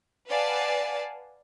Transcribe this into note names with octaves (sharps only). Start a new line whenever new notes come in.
B4 D5 F5 F#5 G#5 A5